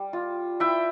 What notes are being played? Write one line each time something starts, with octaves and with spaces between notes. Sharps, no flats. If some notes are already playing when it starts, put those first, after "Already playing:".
Already playing: G3
F4
E4 E5 G5